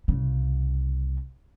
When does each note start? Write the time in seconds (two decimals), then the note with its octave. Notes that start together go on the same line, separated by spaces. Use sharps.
0.08 C2 C#3